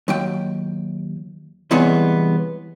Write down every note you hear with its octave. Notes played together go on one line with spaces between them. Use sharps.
D#2 F#3 G5
C2 C3 E3 G#3 B3 C#5